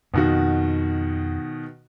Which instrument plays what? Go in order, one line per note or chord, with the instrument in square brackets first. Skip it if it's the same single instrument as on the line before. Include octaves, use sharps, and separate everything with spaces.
[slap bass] F2 [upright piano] B2 D#3 F#4